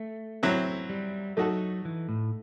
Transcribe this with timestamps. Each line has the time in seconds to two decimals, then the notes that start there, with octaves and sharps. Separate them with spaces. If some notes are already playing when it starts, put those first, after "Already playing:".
Already playing: A3
0.43 F#3 C4 E4
0.89 G3
1.37 F#3 A3 D#4 F#4 A4
1.85 E3
2.09 A2